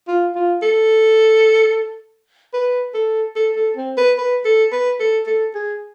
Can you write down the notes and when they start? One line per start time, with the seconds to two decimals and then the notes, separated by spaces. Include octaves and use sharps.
0.08 F4
0.35 F4
0.62 A4
2.53 B4
2.94 A4
3.36 A4
3.56 A4
3.76 C4
3.97 B4
4.18 B4
4.45 A4
4.72 B4
5.00 A4
5.27 A4
5.55 G#4